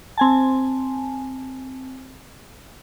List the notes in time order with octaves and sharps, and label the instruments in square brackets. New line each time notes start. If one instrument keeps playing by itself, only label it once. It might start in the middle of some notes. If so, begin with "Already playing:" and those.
[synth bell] C4 G#5 A5